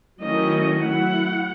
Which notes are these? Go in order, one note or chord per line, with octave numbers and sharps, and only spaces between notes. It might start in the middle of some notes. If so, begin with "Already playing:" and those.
D#3 F#3 A3 C#4 E4 D#5
F#3 A3 E4 F#5